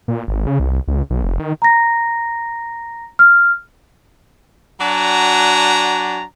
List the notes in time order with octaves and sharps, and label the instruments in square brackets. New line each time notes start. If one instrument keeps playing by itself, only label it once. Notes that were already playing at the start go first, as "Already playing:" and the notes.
[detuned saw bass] A#2
G#1
C#3
C2
C#2
B1
F1
D#3
[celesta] A#5 A#6
F6
[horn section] F#3 D4 F#4 D5 G#5 A#5